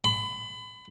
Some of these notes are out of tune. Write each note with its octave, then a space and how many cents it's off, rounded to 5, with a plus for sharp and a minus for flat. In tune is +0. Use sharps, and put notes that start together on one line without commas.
B5 +30